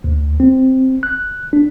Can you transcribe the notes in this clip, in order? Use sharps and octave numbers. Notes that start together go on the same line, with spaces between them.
D2
C4
F#6
D4